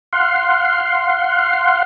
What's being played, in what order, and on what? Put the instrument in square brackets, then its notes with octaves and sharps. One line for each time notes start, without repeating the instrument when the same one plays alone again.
[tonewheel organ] F5 F#5 C6